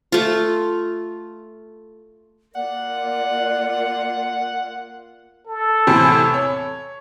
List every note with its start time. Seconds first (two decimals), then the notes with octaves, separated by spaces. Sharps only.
0.12 A3 F4
2.55 A#3 F4 D5 F#5
5.47 A4
5.87 E2 A2 C3
6.34 C#5